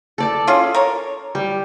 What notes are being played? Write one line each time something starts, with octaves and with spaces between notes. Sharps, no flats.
A4 D5 A5
C#4 F4 G#4
A#4 C#5
G3